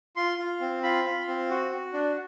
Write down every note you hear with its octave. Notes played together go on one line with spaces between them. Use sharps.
F4 C6
F4
C4
F4 B5
F4
C4
F#4
F#4
D4